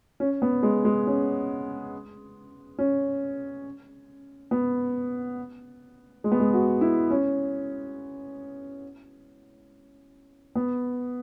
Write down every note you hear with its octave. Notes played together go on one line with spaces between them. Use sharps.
C#4
B3
G#3
G#3
C#4
C#4
B3
G#3
B3
G#3
F#4
E4
C#4
B3